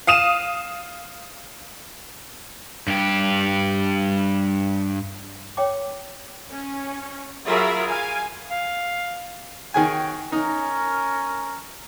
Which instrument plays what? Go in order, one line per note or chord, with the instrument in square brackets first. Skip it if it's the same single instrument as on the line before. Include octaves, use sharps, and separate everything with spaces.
[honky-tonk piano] F5 D#6 D#7 E7
[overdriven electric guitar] G2 G4
[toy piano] C#5 G5 D6
[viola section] C#4
F#3 F4 G#4 A#4 E5 B5
F5 G#5
[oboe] F5
[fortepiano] D#3 G#4 G#5 [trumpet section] F#4 C#5 G5
[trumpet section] C#4 A#4 [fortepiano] D#4